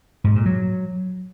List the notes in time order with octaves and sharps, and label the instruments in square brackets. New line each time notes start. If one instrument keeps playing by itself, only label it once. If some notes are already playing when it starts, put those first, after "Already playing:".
[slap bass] G#2
A#2
F#3